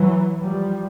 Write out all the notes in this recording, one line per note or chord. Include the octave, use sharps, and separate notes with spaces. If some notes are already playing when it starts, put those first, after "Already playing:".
Already playing: E3 F#3
F3 G3